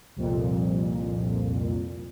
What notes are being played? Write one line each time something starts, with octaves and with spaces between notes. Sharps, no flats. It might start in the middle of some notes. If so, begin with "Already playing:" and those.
C2 F2 A#2